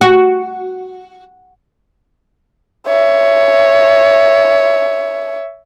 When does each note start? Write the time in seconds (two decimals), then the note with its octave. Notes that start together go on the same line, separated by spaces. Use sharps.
0.01 F#4
2.87 C#5 E5